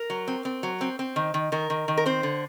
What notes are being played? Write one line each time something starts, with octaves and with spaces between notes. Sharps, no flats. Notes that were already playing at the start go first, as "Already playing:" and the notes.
Already playing: A#4
F#3
C4
C4
F#3
C4
C4
D#3
D#3
D#3 A#4
D#3
D#3
A#4
C4 C5
D3